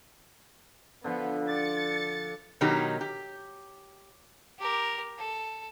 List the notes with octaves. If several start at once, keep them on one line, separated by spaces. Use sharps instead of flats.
D3 F3 B3
D5 A6 C#7
B2 D#3 F#3 D#4 G4
G4
G4 A#4
A4